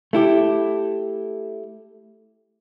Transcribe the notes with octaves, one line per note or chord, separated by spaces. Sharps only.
A3 E4 G4